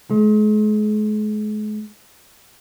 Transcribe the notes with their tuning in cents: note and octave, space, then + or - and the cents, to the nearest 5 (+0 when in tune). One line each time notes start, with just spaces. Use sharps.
G#3 +40